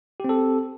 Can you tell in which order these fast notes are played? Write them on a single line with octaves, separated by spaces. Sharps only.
G4 C4 A4